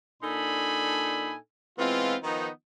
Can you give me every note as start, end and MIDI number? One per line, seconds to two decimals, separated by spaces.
0.22 1.34 46
0.22 1.34 62
0.22 1.34 63
0.22 1.34 69
0.22 1.34 80
0.22 1.34 83
1.78 2.15 52
1.78 2.15 56
1.78 2.15 59
1.78 2.15 60
1.78 2.15 65
2.23 2.48 51
2.23 2.48 53
2.23 2.48 59
2.23 2.48 63